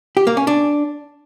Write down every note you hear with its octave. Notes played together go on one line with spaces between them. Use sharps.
G4
A#3
C#4
D4